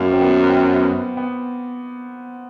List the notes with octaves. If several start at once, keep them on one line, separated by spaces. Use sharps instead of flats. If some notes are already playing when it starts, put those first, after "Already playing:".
Already playing: F#2 A#3
C4
B3
C4
B3
B3